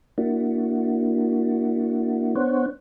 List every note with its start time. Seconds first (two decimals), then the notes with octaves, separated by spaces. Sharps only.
0.18 A#3 D4 E4 F#4
2.35 B3 D4 C5 C#5 F#5